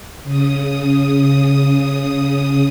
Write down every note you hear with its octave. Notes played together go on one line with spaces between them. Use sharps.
C#3 D#6